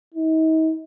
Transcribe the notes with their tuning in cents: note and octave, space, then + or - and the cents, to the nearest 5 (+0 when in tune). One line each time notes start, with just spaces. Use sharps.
D#4 +40